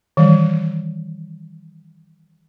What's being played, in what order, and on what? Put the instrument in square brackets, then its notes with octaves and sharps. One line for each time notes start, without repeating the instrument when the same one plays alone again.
[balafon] D#3 E3 G3